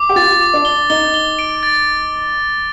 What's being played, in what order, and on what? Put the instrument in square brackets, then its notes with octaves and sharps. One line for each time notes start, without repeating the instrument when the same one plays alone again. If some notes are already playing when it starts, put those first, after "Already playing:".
Already playing: [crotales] D6
[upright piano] G4
[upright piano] F4 [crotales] A6
[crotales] D6
[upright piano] D4
[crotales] G7
[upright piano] D#4 [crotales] G7
[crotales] G7
D7
A6